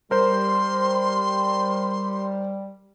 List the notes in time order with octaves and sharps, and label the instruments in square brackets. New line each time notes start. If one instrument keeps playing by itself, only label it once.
[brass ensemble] G3 [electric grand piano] A#4 C5 [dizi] C6